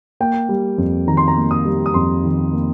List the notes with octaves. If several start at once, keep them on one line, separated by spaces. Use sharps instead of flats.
A#3 G5
G3
F2
D#3 A#5
C6
A#5
A#3
D#6
G3
D#6
F2 C6
D#3
A#3